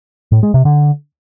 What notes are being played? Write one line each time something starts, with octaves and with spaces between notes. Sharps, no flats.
A2
G#3
C3
D3